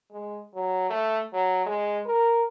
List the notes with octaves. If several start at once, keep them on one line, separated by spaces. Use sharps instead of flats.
G#3
F#3
A3
F#3
G#3
A#4